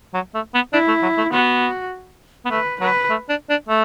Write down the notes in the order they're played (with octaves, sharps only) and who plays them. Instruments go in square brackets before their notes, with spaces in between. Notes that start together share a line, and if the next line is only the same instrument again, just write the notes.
[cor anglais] F#3
A3
B3
[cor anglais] D4 [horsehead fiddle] E4
[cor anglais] A3
F#3
A3
[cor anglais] B3 [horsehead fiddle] F#4
[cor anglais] B3
[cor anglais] A3 [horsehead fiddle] B4
[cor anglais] F#3 [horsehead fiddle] B4
[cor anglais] A3
D4
D4
A3